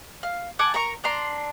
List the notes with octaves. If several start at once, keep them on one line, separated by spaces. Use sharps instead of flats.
F5
F#5 G#5 A5 D6
A#4 A#5 C#6
D4 A#5 C6